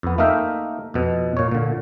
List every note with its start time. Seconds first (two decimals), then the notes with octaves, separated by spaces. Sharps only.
0.03 F2 B3
0.18 A3 A#3 D#4 A#4 E5 G5
0.94 F2 B2
1.37 A#2 C#5
1.51 A#2 D3